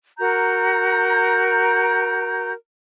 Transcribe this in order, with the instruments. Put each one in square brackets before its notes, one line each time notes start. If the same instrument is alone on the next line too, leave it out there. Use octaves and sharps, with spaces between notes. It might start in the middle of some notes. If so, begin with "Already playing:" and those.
[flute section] F#4 A#4 A#5 G6